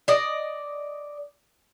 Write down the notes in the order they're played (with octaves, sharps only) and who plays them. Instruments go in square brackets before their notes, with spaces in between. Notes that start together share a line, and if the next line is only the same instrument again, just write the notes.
[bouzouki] D5 D#5